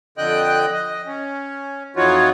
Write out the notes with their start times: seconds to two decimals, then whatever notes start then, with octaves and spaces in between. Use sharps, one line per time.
0.18 F2 D3 D#5 G5 F#6
0.72 D#5
1.07 C#4
1.96 F2 E3 D#4 F4 F#4 C#5